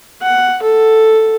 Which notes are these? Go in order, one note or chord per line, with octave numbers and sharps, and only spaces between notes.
F#5
A4